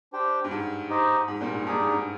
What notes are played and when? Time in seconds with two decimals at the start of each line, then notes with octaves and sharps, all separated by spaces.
0.13 D4 G4 C5 G5
0.44 G2
0.51 G#2
0.90 D#4 G4 C5 D#5
1.28 G#2
1.41 G2 A#2
1.55 G#2
1.66 G2 D#4 G#4 D5 G#5
1.80 G#2
1.92 G2